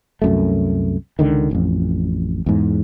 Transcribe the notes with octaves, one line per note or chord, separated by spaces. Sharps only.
C2 F#2 A3
C#2 D3 D#3
A1 F2
E2 G#2